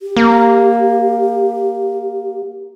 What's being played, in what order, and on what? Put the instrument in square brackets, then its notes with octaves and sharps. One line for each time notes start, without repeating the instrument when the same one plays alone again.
[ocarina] G4
[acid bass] A#3